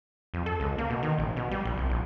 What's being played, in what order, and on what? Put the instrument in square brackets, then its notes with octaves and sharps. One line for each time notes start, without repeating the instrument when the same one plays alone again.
[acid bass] F2
A4
C#2
A#3
B2
D#3
A1
B2
G3
A#1
C2
A#1